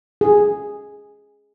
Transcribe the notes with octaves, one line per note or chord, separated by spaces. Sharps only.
G#4